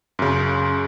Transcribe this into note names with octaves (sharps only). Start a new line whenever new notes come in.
F#2 C#3